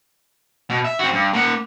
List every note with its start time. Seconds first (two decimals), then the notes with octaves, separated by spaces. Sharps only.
0.70 B2
0.85 E5
0.99 C4 F#4
1.13 G2
1.33 A#3 F#5